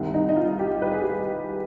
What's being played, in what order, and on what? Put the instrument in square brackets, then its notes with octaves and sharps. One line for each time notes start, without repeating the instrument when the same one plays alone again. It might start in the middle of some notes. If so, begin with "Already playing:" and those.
Already playing: [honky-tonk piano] C2 C3 D#3
D#4
D#4
F4
G4
B4
G#4
G4
G#4